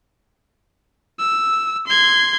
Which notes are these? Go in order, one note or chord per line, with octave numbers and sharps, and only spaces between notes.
E6
C6 G#6